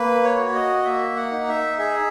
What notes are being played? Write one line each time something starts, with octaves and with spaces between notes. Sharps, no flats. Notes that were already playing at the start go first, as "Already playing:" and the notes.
Already playing: A#3 B4
C#5
F#4
D#5
A#3 E5
F#5
D#4
E5
G#4 E5